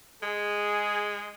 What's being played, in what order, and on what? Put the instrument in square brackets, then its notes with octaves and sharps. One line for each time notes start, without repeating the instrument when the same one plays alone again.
[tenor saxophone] G#3 [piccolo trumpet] G#4